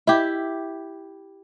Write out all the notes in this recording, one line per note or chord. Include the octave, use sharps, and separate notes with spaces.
E4 G4